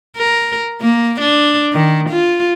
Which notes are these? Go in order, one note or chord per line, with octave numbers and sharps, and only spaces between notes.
A#4
A#3
D4
D#3
F4